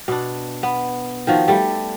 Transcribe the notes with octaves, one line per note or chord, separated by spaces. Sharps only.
B2 D4
B3
D#3 F3 F#4
G3 A3